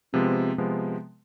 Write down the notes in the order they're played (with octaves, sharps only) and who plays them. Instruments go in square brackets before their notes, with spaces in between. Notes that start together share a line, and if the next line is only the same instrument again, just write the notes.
[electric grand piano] C3 F3 G#3 B3 [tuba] C4
[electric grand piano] C3 F3 G#3 B3